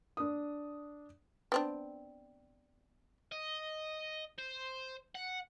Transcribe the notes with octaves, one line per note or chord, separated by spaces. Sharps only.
D4 D#6
B3 C4 D4
D#5
C5
F#5